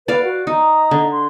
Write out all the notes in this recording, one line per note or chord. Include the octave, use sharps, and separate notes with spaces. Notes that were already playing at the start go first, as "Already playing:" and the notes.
B4 D5 F5 F#5
F#4
D#4 D#5 A#5 D#6
D3
C6